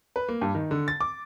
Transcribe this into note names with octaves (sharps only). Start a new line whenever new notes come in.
B4
A#3
G2
D#3
D3
A6
D6